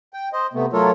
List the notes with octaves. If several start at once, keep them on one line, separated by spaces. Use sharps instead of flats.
G5
C5 D#5
C3 A3 B3
F#3 A3 F4 A4 A#4 C#5